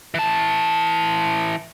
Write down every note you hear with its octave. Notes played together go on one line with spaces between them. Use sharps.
E3 A5